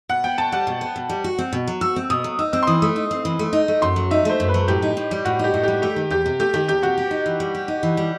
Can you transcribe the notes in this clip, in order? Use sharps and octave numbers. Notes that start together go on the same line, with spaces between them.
B2 F#5
B3 G5
B2 A5
G3 F#5
B2
B3
B2
G3
F#4
C4
B2
F#3
F#4 E6
C4
B2 D#6
F#3
D#4 E6
C4 E6
C6
E3 D#6
A3 D#6
D#4
C4
E3
A3
D#4
A3
F#2 C6
F#3
D#4 E5
A3 C5
F#2
B4
F#3
A2 G4
D#4
A2
G3
A2 F#4
D#4 G4
A2
G3 G4
A3 G4
D#3
E2 G4
C3
A3 G4
D#3 G4
E2 G4
C3 F#4
G4
D#4
E3
G3
G4
D#4
E3
G3